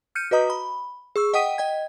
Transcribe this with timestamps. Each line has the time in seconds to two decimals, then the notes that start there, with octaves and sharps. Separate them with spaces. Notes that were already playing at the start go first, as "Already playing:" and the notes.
0.15 F6 G6 C#7 D#7
0.31 F#4 B4 D#5 A#5 D#6
0.50 B5
1.16 G#4 C#6 E6
1.34 D#5 F#5 G5 D#6 B6 D#7
1.58 D#5 G5 G#6